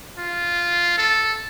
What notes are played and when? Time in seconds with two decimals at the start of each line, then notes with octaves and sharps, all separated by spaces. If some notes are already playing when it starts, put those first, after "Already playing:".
0.18 F4
0.98 A4